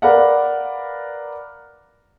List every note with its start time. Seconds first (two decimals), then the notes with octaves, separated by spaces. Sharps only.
0.02 A#4 B4 D5 F5 F#5